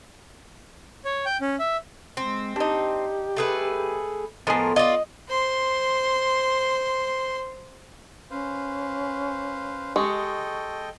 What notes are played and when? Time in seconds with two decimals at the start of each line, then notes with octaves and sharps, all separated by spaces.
1.05 C#5
1.26 G5
1.41 C#4
1.59 E5
2.17 G#3 C4
2.56 D4 D#4 G4
3.37 A3 G#4 B4
4.47 A2 F3 G#3 B3 G#4 A#4
4.76 F4 D5 D#5
5.28 C5 C6
8.31 C#4 B4 C5 F5
9.96 G#3 G4 A4 D#5 G5 C#6